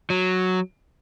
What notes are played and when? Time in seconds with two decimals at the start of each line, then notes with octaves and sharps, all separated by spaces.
0.10 F#3